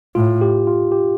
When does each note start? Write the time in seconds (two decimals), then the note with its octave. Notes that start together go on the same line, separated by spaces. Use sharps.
0.15 A2 F4
0.41 G4
0.67 F4
0.91 G4